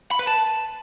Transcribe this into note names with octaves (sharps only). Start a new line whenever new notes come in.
B5
B4
A5